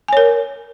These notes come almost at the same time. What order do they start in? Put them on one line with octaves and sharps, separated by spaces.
G#5 C#5 A#4